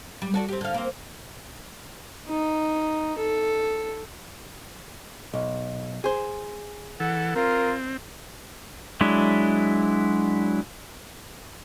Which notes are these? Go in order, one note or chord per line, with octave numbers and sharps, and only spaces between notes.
G3
F#4 A4 D5
C4 G4
D3 F5
A#3 C4
D#4
A4
B1
G#4 C5
E3 A4 F#5
C4 F4 A#4
F#3 G#3 D4 E4